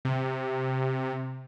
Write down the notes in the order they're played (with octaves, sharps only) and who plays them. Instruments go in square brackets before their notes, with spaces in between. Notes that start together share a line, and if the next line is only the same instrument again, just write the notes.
[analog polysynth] C3